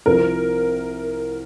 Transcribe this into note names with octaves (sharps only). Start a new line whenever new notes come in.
C2 C3 F3 C4 A#4